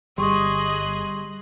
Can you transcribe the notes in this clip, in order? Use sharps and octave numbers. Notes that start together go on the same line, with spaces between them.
G1 G3 G#4 D#5 C6 C#6 D#6 F#6